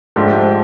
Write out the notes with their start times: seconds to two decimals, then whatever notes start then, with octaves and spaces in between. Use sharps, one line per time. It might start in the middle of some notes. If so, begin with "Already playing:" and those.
0.16 G#2 F3 A3 D4 G4